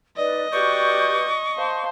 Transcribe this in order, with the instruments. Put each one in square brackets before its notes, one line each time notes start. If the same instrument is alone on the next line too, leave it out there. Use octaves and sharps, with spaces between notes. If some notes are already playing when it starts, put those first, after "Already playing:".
[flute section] D#4 B4 D5 [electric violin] D#5
[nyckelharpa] F#4 D5 [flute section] G4 B4 G6 [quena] C#6
[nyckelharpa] C5 [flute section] F5 A5